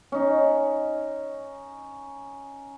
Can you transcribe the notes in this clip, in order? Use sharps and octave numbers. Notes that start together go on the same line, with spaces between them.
C#4 D#4